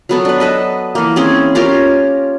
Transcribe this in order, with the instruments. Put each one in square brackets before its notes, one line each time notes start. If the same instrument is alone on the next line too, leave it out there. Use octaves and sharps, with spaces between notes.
[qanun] F#3 B3 A4
D4 B4
A4 B4 D#5
E3 A#3
C4 C#4 G#4
C#4 F4 G4 A#4